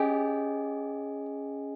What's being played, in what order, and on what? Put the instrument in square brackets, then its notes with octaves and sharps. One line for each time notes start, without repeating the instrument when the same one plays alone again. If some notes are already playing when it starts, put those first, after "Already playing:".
Already playing: [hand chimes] C#4 G#4 D#5 G#5 [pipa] G4